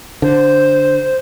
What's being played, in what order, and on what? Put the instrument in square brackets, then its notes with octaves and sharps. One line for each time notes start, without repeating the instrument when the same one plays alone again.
[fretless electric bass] D3 [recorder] C5